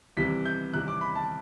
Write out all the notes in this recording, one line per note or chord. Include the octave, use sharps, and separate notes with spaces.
C2 C3 E3 B6
G6
C2 C3 E3 F#6
D6
B5
A5